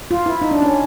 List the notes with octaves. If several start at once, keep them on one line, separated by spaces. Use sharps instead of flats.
F4
E4
D#4
D4
C#4